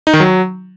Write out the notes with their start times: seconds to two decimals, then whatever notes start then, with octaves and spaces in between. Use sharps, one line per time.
0.07 D#4
0.13 D#3
0.20 F#3